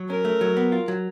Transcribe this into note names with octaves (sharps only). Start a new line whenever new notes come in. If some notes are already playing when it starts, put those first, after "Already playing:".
Already playing: F#3
C#4 A#4
A3
F#3
B3
F4
F#3